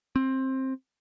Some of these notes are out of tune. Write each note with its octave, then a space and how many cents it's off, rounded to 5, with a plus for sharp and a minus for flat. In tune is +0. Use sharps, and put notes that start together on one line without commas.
C4 +15